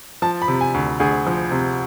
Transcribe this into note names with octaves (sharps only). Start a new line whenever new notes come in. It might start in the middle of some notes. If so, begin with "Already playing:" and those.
F3 A5
B5
C3
G#5
D2
D2 G#4
F3
C3